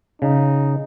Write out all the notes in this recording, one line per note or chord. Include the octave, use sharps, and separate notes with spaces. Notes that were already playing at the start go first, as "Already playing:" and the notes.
C#3 D#4